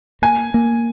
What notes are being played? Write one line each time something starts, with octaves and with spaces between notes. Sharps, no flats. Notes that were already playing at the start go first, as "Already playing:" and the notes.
A#3 G#5
A#3